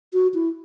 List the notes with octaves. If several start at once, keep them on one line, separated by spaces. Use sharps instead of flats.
F#4
E4